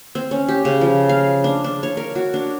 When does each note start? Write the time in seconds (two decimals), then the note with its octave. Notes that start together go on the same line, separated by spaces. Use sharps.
0.15 C4
0.31 C#4
0.48 G4
0.65 C#3
0.81 F3
1.09 F5
1.44 D4
1.64 D4
1.83 C#5
1.97 A#4
2.15 F#4
2.34 D4